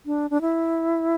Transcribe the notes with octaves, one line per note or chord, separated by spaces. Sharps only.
D4
D4
E4